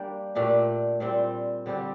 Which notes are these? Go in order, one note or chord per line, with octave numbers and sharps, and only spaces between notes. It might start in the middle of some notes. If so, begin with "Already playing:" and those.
Already playing: G3 A#3 D4 G4
A#2 A3 D4 G4
A#2 G3 C4
D3 G3 C4 G4